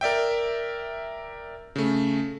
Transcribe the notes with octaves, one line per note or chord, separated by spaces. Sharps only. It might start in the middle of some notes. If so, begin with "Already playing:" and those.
A#4 D5 E5 G5
C#3 A3